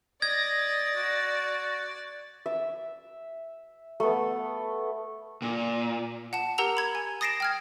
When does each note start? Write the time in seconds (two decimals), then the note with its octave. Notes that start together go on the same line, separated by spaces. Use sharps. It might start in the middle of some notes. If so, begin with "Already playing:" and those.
0.22 D5 D#5 G#6 A#6
0.96 F#4
2.46 E5
4.00 A3 B3
5.42 A#2
6.33 F#5 A5 E7
6.58 G4 A#4 F#5 A#5 E6 F7
6.77 B5 G#6
6.95 G#5
7.21 D#6 A6 A#6 C7 D7 E7
7.40 G5 F6 G#6